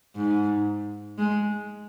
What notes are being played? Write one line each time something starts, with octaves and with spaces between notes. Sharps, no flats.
G#2
G#3